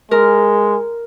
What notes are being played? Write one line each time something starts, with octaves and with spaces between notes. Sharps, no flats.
G#3 A#4